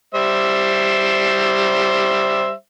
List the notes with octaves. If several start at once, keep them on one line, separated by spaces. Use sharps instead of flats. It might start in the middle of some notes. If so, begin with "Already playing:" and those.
G3 C5 E5